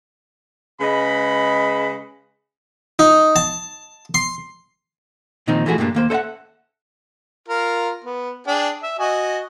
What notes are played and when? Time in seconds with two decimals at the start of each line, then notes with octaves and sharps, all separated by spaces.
0.80 C#3 G#3 B4 D#5 B5
2.99 D#4
3.36 A5
4.14 C6
5.48 A#2 D#3 F3 C4 D#4
5.66 E3 F3 A3 F#4 G#4
5.78 G2 A#2 G3 A#3 D4
5.95 D#2 A#3 C5
6.10 A4 C5 D#5 E5 F#5
7.48 F4 A#4
8.04 B3
8.47 D4 G#4 G5
8.83 E5
8.99 F#4 D#5 G#5